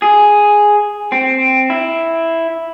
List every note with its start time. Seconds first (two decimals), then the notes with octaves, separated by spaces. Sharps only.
0.02 G#4
1.12 C4
1.70 E4